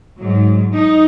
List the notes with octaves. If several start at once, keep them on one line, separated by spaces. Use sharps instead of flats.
G#2 F#3
D#4